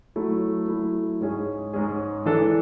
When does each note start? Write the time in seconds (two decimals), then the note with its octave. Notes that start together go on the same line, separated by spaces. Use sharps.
0.16 F#3 A3 E4
0.68 F#3 A3 E4
1.21 G#2 G#3 C#4 G#4
1.73 G#2 G#3 C#4 G#4
2.26 E3 G#3 D4 A4